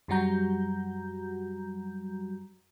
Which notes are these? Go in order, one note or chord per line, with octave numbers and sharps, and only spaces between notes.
F#2 F#3 G3 F#4 A#5 G6